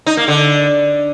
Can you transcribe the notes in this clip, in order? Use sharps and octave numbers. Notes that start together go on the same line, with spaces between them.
D#4
A#3
D3